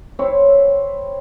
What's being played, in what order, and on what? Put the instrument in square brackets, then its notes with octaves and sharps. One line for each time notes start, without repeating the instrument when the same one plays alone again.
[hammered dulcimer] C4 E4 C#5